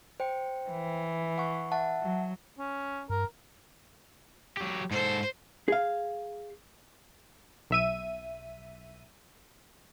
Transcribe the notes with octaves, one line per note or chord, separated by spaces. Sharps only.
C5 G5 C#7
E3
F#5 C#6
E5 F#5 A5
F#3
C#4
G2 A#4
F#3 G4
G#2 A4 C5
G#4 F5
B1 E5 D#7